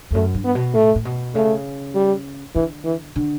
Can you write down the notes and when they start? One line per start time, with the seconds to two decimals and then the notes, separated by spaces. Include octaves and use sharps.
0.11 E2
0.14 F#2 A3
0.35 G2
0.44 B3
0.55 B2
0.74 A2 A3
0.96 A2
1.05 B2
1.35 C#3 A3
1.95 G3
2.55 D3 E3
2.84 E3
3.16 D3